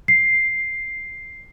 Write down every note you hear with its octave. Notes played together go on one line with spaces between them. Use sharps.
C7